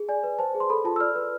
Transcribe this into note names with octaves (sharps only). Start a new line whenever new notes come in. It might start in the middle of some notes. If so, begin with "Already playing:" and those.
Already playing: G#4
D5 G#5
B4
C5 A5
G#4
C6
A4 B5
F4 A5
E6
D5 F6
B4